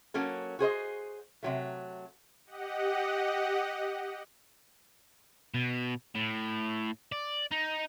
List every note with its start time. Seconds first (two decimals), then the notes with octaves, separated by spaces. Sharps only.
0.14 F#3 A#3 C#4 A4
0.59 F#4 G#4 C5 D#5
1.43 C3 F#3 A3
2.46 G4 D#5 F#5
5.54 B2
6.15 A2
7.12 D5
7.52 D#4